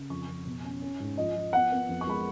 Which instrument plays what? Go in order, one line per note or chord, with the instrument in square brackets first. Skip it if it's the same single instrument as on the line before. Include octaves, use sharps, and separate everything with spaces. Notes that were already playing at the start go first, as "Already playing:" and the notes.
Already playing: [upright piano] C#3
F2 C#6
F2
B2
C#4
C#4
G#2
F3 D#5
F3
B3 F#5
B3
F2
C#6
G#3 B5